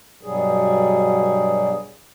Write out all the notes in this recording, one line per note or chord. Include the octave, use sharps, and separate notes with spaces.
G2 B2 F#3 G3 G#4